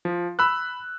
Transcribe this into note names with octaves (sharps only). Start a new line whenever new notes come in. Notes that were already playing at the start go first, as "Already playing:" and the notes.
F3
B5 E6 F#6